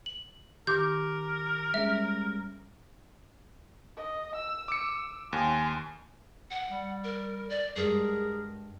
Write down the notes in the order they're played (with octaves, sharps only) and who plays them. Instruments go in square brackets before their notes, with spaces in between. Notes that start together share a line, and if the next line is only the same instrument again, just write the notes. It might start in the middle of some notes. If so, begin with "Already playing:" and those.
[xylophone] F#7
[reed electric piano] D#3 [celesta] G4 D6 [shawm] A#4 [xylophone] G6
[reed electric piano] G3 G#3 C#4 [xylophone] E5
[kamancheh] D#5
E6
[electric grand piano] D6 C#7
[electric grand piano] D#2 [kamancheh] G#5 C6
[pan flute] F#5
[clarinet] G3
[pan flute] A#4
D5
[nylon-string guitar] G2 G#3 [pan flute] G#4 [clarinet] A#4